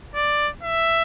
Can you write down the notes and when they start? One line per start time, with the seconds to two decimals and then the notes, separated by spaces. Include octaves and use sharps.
0.15 D5
0.63 E5